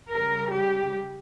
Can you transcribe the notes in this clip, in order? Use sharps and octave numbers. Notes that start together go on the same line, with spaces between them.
C#3 G3 A#4
G4